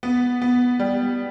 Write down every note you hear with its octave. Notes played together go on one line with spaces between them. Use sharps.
B3
B3
G3